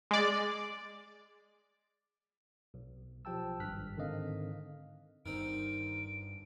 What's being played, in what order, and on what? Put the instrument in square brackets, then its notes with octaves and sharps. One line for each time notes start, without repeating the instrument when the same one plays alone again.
[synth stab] G#3 D5
[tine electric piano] B1
B1 F3 G4 G5 A5 E6
G#1 G2 F6 F#6 B6
G#2 D3 D#3 C4 D#5 F5
[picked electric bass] G1 G2 [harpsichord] D#3 C4 [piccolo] D7